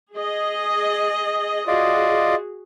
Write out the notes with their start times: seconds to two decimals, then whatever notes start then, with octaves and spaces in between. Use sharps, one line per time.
0.13 G#4 D#5
1.68 F4 F#4 G#4 D5 D#5